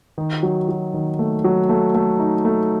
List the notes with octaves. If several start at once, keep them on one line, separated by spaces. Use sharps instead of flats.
D#3
F#3
F#3
D#3
A3
F#3
A3
A3
D#4
A3